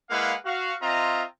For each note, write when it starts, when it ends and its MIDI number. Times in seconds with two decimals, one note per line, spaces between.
0.10 0.34 56
0.10 0.34 58
0.10 0.34 64
0.10 0.34 71
0.10 0.34 77
0.10 0.34 78
0.45 0.74 66
0.45 0.74 77
0.82 1.23 60
0.82 1.23 65
0.82 1.23 75
0.82 1.23 76
0.82 1.23 82